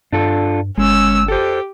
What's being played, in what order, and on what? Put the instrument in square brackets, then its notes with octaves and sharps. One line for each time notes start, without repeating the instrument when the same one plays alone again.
[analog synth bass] G2 [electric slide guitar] D4 F4 A4
[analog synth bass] G1 [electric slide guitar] G#3 [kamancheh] C#4 E6
[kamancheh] G4 [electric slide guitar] A4 C5